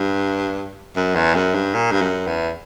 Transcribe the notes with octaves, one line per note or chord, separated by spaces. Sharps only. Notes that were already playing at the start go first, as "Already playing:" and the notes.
Already playing: G2
F#2
E2
F#2
G2
A#2
G2
F#2
E2